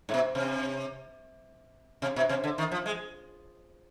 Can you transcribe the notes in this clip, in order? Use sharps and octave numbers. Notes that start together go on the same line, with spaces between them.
G#2
B2
C3
C3
B2
C3
D3
D#3
F3
G#3